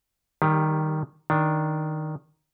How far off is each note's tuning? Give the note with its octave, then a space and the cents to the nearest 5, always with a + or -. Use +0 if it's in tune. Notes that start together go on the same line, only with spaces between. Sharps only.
D#3 +0 G3 +0 G4 +25
D#3 +0 D4 +0